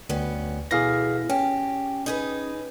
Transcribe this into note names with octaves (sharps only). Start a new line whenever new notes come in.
D2 G2 B3 C#4
B2 E3 A3 G#4 F5 A#6
C#4 G4
D#4 G#4 B4